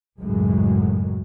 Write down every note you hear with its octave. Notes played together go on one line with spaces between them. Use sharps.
G#1 C#2 F#2 A2 F#3 G#3